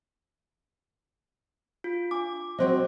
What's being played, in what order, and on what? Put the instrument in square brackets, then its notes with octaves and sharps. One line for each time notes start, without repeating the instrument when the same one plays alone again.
[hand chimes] F4
[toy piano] D4 F5 [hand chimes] D6
[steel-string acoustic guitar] F#3 C4 D#5 [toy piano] C5 D5